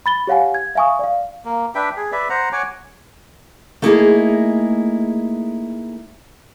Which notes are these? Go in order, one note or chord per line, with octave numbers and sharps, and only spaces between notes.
B5 A6 G7
G4 C#5 F5 F#5 G#5
G#6
E5 F5 G#5 C#6 D#6
D5 F5
A#3
D4 B4 E5 G5
G#4
B4 D5 E5
C5 F#5 A#5
C#5 F#5 G#5 D6
A3 A#3 D#4 E4 F#4 G#4